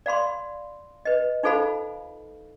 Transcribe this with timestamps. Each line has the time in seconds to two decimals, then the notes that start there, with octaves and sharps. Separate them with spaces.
0.06 D5 F5 B5 C6
1.05 B4 D#5
1.43 D#4 F4 A4 C5 F5 B5